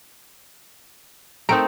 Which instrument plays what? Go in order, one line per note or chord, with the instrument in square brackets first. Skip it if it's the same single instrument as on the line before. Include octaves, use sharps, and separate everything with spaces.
[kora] A3 C4 D#4 [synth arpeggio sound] A#4 D7